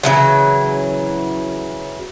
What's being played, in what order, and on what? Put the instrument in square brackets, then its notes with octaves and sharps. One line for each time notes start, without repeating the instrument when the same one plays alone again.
[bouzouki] C#3 E3 F#3